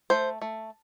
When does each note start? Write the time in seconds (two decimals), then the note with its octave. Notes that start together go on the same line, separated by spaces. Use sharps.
0.10 A3 C5
0.42 A3